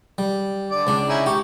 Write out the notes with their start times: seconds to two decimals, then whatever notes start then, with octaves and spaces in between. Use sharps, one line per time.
0.18 G3
0.71 D3 D5
0.87 C#2 D4
1.08 C#4 D#4 E4
1.26 G4 C#6